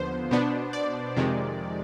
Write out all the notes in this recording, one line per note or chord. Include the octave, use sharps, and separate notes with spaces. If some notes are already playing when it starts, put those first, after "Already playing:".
Already playing: D#2 D3 F3 B3 C5
B2 B3 D4
D5
F2 C3 D#3 G#3